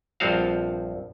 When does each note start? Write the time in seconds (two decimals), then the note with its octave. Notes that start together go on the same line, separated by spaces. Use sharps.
0.20 A#1 G2 F3 C4 F#4 F5